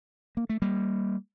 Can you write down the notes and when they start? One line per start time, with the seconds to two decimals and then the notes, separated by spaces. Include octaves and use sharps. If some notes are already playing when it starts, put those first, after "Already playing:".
0.37 A#3
0.49 A3
0.62 G3 A#3